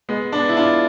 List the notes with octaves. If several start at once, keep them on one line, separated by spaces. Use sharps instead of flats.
G#3 B3
B3 D4
E4
D4 F4